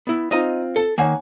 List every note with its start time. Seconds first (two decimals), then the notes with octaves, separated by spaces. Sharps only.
0.07 B3 E4
0.31 C4 D#4 F4 D#5 A#5
0.76 A4
0.98 D#3 A#3 C#5 F#5 G#5